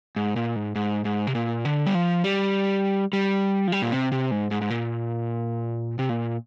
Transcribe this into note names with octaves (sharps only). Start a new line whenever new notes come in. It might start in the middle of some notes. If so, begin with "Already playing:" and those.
G#2
A#2
G#2
G#2
G#2
C3
A#2
D3
G3
F3
G3
G3
F3
G3
A#2
C3
C3
G#2
G#2
G#2
A#2
C3
A#2